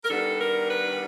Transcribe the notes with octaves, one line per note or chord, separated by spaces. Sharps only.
A#4
D#3 G3 B3 D4 A4
A#4
B4